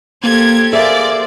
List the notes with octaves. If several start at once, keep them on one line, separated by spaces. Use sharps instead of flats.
A#3 G4 A4 C5 G#6
A#3 G#4 C5 D5 E5